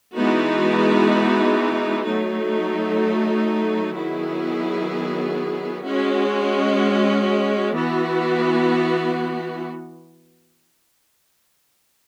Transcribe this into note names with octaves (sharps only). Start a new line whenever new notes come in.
E3 G#3 B3 D#4 F#4
F#3 A3 D#4
D#3 F#3 B3 E4 G#4
G#3 C#4 F#4
E3 B3 F#4